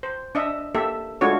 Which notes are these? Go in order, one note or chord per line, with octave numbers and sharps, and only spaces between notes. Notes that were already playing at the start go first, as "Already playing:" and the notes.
C5
D4 D#5 E5
A#3 G4 A4 E5
G#3 A3 D4 F4 F#4 C#5